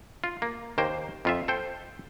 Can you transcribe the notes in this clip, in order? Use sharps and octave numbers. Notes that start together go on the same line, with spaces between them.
F4
A#3
D#2 A#3 C5 G5
F2 F4 E5
A4 C5 G5